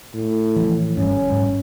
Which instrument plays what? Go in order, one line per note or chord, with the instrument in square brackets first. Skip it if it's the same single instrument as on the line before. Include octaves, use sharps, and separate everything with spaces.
[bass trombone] A2
[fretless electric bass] E3 F3
[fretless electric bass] G1 G2 [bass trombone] C#4
[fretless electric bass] G#2 G3